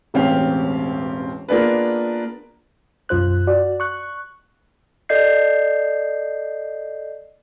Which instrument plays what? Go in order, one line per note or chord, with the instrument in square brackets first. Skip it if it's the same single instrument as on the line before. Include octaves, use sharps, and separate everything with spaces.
[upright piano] E1 A1 C4 C#4 G4 F5
A#3 B3 D4 F4 G#4 B4
[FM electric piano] B1 F#2 F4 C5 F#6
F#4 D5
C#6 F#6
[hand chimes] A4 D5 D#5 G6 C7